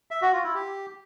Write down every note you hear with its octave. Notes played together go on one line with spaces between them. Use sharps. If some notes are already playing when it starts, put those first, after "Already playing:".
E5
F#4
F4
E4
G4